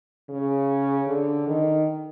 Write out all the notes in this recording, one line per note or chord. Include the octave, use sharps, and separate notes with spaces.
C#3
D3
D#3